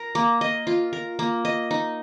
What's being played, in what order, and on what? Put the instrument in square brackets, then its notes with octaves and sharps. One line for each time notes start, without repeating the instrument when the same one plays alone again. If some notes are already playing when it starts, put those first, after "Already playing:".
Already playing: [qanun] A#4
A#3
D#5
F4
A#4
A#3
D#5
D#4